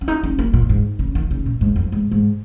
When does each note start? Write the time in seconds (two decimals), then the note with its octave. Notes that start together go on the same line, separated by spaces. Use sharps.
0.01 C#4
0.08 D#4
0.23 C#4
0.39 A#3
0.53 A#2
0.69 G#2
0.99 C#3
1.15 D#3
1.31 C#3
1.46 A#2
1.61 G#2
1.76 F2
1.92 G#2
2.11 G#2